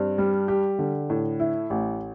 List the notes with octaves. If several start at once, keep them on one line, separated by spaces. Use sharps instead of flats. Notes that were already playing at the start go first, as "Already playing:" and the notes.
Already playing: G2 C4
G3
G4
D3
A2
E4
A1